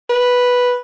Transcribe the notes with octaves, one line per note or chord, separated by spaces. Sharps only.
B4